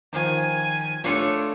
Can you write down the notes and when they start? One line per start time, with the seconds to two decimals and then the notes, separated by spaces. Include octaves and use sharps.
0.13 D#3 F3 G#5
1.04 A3 D4 F4 C#5 C#7